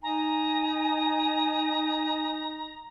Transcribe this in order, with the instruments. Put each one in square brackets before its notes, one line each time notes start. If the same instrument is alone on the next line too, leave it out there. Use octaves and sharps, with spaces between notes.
[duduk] D#4 [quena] G#5 [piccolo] A#5